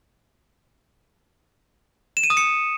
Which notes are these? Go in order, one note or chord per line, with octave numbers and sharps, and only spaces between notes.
E7
D#7
D#6
C#7